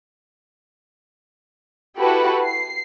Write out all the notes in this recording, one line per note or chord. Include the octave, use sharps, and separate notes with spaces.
E4 F#4 G4 A4 B4 F#5
C7